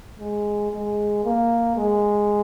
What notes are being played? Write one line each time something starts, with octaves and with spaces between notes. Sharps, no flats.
G#3
G#3
A#3
G#3